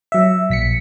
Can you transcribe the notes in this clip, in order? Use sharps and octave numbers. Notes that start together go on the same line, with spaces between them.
F#3 E5
A#1 B6 C#7